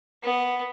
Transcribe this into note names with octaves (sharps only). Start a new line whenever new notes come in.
B3